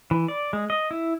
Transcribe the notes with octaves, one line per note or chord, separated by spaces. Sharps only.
E3
D5
G#3
D#5
E4